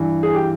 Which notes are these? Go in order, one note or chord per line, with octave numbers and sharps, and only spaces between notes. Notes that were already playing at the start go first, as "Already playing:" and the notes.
Already playing: G2 E3
G#4
G4